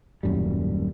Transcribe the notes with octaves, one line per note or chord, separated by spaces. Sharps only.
D#1 F#2 A2 G3